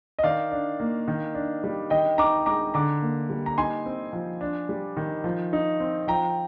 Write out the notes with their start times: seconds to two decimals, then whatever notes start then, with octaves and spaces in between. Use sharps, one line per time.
0.19 D#5
0.23 D#3 D5 F5
0.52 D4
0.80 A#3
1.08 D#3
1.35 D4
1.64 G3
1.90 D#3 D#5 G5
2.18 D#4 A#5 D6
2.46 G#3 A#5 D6
2.74 D3 A#5 D6
3.02 A#3
3.30 G3
3.46 A#5
3.58 D#4 G#5 C6
3.86 C4
4.13 F3
4.41 D4
4.69 G3
4.97 D#3
5.24 F3
5.53 D#4
5.80 C4
6.07 F3 G5 A#5